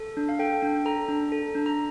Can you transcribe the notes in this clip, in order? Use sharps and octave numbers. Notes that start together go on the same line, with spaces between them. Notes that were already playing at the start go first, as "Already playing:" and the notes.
Already playing: A4
D4
F5
A4 G5
D4
A4 A#5
D4
A4
D4
A#5